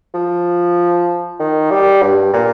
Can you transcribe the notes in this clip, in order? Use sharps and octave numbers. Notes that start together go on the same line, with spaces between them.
F3
D#3
G3
G2
A#2